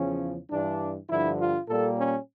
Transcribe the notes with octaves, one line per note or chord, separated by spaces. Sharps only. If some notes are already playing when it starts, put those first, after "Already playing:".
Already playing: E2 C#3 F3 C#4
G2 E3 G3 D4
G2 D3 F3 E4
F4
A#2 G3 A#3 A4
C#4